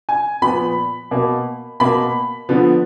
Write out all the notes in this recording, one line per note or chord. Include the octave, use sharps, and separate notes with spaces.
G#5
A#2 F3 B3 B5
B2 A#3
B2 A#3 B5
D3 F3 B3